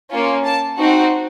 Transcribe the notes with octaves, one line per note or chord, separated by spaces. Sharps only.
A#3 C#4 F4
A5
C4 D#4 F#4